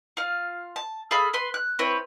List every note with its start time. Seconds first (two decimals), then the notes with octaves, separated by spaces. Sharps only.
0.17 F4 F5
0.76 A5
1.11 G#4 A4 F5 B5
1.34 B4 C6
1.54 F#6
1.79 C4 E4 B4 C#5